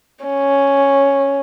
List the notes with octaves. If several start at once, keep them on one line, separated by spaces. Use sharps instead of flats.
C#4